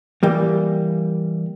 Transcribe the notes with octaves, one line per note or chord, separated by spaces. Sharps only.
E3 G3 A#3